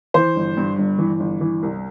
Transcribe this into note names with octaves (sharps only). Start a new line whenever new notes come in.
E3 C5
G1
G2
G1
E3
G1
E3
C2